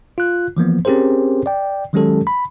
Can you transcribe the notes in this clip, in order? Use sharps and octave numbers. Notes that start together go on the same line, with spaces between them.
F4 F#6
E3 F3 A#3 B3
C4 C#4 G4 G#4 A#4 C5
D5 G5
D#3 F#3 G#3 C#4 G4 A4
B5